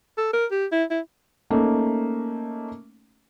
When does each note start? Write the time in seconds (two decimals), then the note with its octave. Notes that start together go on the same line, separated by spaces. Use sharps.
0.18 A4
0.33 A#4
0.51 G4
0.72 E4
0.91 E4
1.50 A3 A#3 C#4 D#4